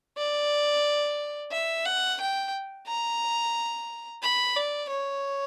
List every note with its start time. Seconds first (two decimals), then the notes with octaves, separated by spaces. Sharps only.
0.17 D5
1.52 E5
1.85 F#5
2.20 G5
2.87 A#5
4.23 B5
4.56 D5
4.90 C#5